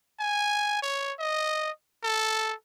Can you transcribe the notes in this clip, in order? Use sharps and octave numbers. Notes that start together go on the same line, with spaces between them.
G#5
C#5
D#5
A4